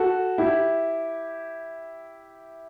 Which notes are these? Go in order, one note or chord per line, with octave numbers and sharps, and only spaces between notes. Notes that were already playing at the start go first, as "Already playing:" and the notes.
Already playing: F#4 A4
E4 G4